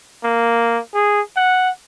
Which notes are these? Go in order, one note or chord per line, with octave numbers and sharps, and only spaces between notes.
A#3
G#4
F#5